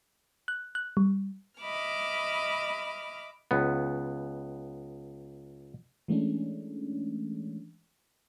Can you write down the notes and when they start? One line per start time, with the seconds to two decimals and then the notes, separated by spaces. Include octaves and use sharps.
0.48 F#6
0.75 F#6
0.97 G3
1.61 D#5 E5 B5 D6 F6
3.51 C#2 B3
6.08 E3 G#3 A3 C#4 D4